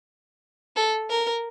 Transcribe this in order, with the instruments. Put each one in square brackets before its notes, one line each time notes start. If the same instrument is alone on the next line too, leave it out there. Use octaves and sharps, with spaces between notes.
[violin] A4
A#4